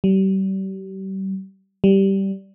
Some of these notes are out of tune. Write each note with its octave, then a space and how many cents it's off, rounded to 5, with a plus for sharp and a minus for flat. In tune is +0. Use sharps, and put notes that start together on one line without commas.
G3 -35
G3 -10